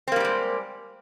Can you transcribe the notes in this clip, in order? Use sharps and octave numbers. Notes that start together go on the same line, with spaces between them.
G3 G#3 A#3 C4 G4